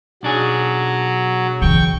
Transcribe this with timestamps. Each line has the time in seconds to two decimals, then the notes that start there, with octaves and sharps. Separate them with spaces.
0.23 B1 F#3 D4 G#4
1.62 C#3 E3 G5 C#6